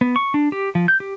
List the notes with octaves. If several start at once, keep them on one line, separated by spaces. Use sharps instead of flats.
B3
C#6
D4
G4
F3
G6
G4